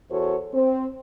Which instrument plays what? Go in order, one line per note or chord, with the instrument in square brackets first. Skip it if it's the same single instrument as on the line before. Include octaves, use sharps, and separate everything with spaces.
[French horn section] E2 F#4 A4 C5 C#5
C4